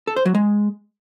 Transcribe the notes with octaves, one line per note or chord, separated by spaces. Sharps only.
A4
C5
F#3
G#3